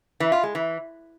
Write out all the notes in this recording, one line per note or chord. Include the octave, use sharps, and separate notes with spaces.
E3
F4
G#3
E3